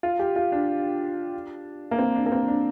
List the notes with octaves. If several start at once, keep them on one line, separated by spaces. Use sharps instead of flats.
F4
G4
F4
D4
A#3
C4
D4
A#3
C4
D4